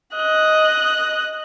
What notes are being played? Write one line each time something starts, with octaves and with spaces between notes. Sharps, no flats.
D#5 F#6